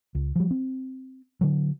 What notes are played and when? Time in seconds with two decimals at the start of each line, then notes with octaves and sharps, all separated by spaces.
0.15 C#2
0.36 F3 G3
0.51 C4
1.41 D3 F#3